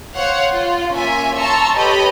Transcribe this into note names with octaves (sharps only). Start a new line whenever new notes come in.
C5 C#5 F5 F#5
F4
A#3 C#4 F4 C#5 E5 G#5
A5 A#5 C6 C#6 E6
G4 A4 B4 C#5 D#5 B5